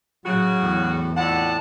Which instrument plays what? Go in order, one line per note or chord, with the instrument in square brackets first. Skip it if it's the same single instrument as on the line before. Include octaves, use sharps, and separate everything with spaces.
[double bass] A2 F#3 [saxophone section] C#3 F#4
[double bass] E2 [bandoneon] A2
[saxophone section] F2 D3 F#5 [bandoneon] A2 A5